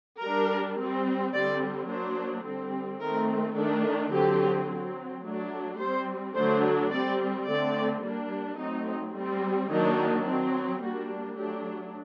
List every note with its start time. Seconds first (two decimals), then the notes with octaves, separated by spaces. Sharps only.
0.21 G3 D4 A#4
0.78 G3 C4
1.33 D3 G3 C4 D5
1.88 F#3 A#3 D4 C5
2.45 D3 G3 C4
3.01 D#3 A3 C4 A#4
3.56 D#3 A3 D4 A4
4.12 D3 F#3 C4 G4
4.69 F#3 C4
5.23 F#3 A3 D4
5.79 G3 C4 C5
6.35 D3 F#3 A3 D4 C5
6.90 G3 C4 D5
7.46 D3 A3 C4 D5
8.02 G3 A#3 D4
8.58 F#3 A3 C4 D#4
9.15 G3 C4
9.70 D#3 F#3 A#3 D4 D#4
10.26 F#3 C4
10.82 G3 A#3 D4 F#4
11.37 F#3 A3 D4 G4